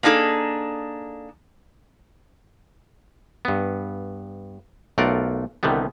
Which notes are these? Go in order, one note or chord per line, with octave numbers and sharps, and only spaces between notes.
A#3 D4 D#4 G#4 A4
G2 B3
B1 A3 F4 A#4 D5 F#5
C2 D3 D#3 G3 B3